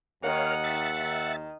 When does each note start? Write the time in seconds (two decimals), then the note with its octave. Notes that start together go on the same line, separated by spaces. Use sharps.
0.23 D#2 D#3 A#4 C#5 F5 F#5
0.64 E5 A6
1.02 D#3